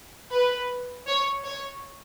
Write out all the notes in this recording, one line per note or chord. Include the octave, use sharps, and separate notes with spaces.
B4
C#5
C#5